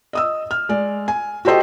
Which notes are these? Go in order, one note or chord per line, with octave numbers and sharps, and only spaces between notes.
D#5 D#6 E6
F6
G#3 D5
G#5
F#4 G4 A4 C5 D#5 G5